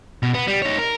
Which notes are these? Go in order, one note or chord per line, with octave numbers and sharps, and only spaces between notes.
B2
B3
G3
D#4 C#5
A#4